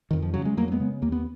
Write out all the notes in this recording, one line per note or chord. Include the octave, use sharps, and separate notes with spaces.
F2 D#3
F3
C#3 F#3
G#3
F2 F#3 A#3
A#3
G#3 B3
C#3
D#2 A#3
B3